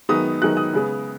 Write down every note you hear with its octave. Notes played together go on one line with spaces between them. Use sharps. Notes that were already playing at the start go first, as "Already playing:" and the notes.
F#2 D#3 G#3 B3 D#4 D#6
F#2 D#3 G#3 B3 D#4 F#6
D#6
C#3 G#3 B3